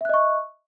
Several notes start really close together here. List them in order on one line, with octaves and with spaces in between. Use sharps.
E5 F#6 D#5 C#6